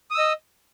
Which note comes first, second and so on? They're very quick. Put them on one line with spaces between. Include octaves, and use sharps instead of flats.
D#6 E6 D#5